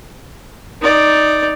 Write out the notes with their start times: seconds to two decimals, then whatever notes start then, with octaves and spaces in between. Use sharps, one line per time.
0.81 D#4 D5